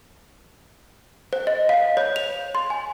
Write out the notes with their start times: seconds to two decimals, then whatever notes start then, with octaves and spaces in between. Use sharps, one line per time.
1.33 C5
1.47 D#5
1.69 F5
1.97 C#5
2.16 F7
2.55 C6
2.70 G#5